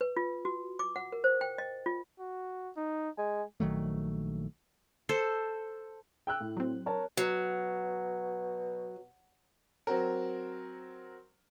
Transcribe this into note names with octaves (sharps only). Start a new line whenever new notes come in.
B4
F4
F#4
D6
F#5
A#4
C5
G5
D#5
F4
F#4
D#4
G#3 G#5
A#1 D#3 F#3 A3
A4 C5
G5 E6 F#6
A2
F#3 C4
A#4 C#5 A5
B2 F#3
F#3 C4 F#4 A#4